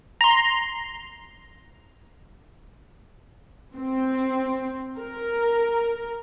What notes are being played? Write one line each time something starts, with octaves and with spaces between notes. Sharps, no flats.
A#5 C6
C4
A#4